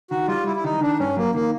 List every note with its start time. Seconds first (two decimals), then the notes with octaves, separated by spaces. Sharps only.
0.10 D#3 F#4
0.28 G3 F4
0.46 G3 E4
0.56 E4
0.64 D#3 D#4
0.81 D#3 D4
0.99 G2 C#4
1.16 F#3 A#3
1.34 D#3 A#3